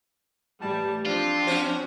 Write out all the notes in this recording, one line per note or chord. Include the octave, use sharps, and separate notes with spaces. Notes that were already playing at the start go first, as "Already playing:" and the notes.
A2 E3 G3 A5
F3 C4 D4 F4
C#4 F#4 C5